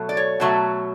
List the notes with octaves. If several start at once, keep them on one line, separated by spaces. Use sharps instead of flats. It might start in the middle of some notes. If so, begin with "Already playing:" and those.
Already playing: B2 F#3 A3
D5
C#5
B2 F#3 A3